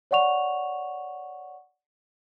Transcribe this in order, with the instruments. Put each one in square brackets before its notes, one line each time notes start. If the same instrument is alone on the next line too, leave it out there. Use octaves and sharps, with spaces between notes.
[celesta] C#5 D5 F#5 C#6 F7